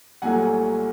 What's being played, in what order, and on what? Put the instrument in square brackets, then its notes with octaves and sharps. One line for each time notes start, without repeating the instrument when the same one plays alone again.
[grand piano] C2 A#2 F#3 A3 F#5 G#5